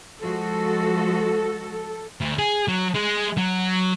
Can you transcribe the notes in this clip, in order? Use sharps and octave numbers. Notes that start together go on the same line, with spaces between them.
F3 G#3 F#4 A4
D2
G#4
F#3
G#3
F#3